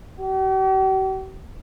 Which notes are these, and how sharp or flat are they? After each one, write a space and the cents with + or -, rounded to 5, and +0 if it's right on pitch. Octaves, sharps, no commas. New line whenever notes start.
G4 -45